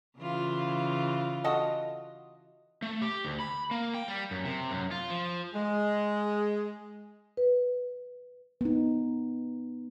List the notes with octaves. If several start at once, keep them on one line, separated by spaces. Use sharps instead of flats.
C#3 E3 F4
F#4 A4 D#5
A3
G4
D2
B5
A#3
G5
G3
F#2
C3
F#2
F4
F3
G#3
B4
B3 D#4